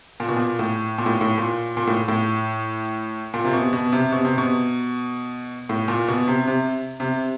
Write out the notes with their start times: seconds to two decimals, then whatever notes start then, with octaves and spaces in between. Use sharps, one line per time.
0.20 A#2
0.28 B2
0.36 A#2
0.59 A2
0.98 A#2
1.06 A2
1.21 A2
1.38 A#2
1.77 A#2
1.87 A2
2.08 A2
3.34 A#2
3.45 C3
3.53 B2
3.73 B2
3.92 C3
4.12 B2
4.25 C3
4.38 B2
5.69 A2
5.88 A#2
6.08 B2
6.28 C3
6.47 C3
7.00 C3